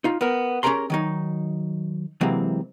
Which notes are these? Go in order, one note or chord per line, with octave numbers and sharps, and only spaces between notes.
D#4 F4
B3 A#4
C#4 G4 G#4 A#4 A#5 C6
D#3 F#3 D#4
C3 E3 F#3 G#3 A#3 C4